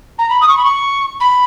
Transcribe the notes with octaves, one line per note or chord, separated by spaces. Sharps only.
A#5
B5
D#6
C#6
B5
C#6
B5